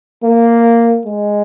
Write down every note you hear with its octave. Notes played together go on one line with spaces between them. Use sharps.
A#3
G#3